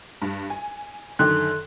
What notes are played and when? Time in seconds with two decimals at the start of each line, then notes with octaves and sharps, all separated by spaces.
0.22 G2
0.50 G#5
1.19 F#2 D3 D#3 A4 C6 F#6